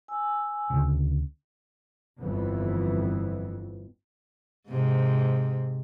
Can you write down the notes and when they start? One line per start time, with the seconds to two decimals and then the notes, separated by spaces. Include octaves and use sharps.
0.08 G#5 E6
0.70 D2 C#3
2.19 G1 F2 E3 B3
4.68 G#2 C3